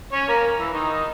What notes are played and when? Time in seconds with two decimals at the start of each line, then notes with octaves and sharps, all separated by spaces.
0.12 C#4 C#5
0.28 A#3 A#4
0.58 E3 E4
0.73 D#3 D#4